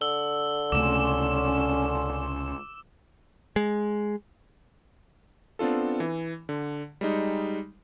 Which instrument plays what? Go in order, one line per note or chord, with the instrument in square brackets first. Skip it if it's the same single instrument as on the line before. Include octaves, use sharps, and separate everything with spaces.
[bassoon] D3 [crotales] E6 G7
[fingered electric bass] C#2 C3 A3 [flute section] C#4 C6 [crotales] D6 E7
[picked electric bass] G#3
[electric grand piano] B3 C4 D4 F4 A4
E3
D3
G3 G#3 D#4